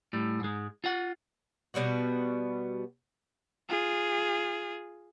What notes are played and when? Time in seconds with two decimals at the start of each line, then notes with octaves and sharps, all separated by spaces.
0.13 A2 G3
0.40 G#2 G#3
0.84 F4 F#5
1.74 B2 G3 B3 F#4
3.69 F4 G#4